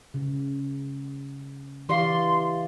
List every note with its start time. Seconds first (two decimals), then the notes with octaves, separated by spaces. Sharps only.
0.14 C#3
1.89 E3 G4 D5 F5 C6